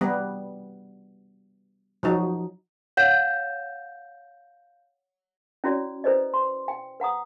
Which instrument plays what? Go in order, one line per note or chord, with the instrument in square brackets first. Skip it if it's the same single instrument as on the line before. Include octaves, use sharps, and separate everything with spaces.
[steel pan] G3 B3
F3 F#3 D#4
[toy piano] C#5 F#5 [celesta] F5 G6 E7
[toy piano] C#4 E4 F#4 C#5 D5
E4 A4 B4 C5 D5 D#5
C6
G5
B4 F#5 A#5 D#6